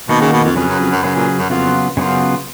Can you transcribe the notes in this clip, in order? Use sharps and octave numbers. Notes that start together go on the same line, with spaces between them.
B2 D#3 A#3 D#4 F#4
C#3
B2
F2
F2 C#3 F#3 C#4 G#4 B4
F#2
F2
F#2
F#2 C#3 F#3 C#4 G#4 B4
A#2
F#2
F2 C#3 F#3 B3 F4
F#2 C#3 F#3 B3 F4